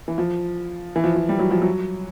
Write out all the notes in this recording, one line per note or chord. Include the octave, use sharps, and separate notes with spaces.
E3
F3
E3
F3
F3
G3
F#3
F3
F#3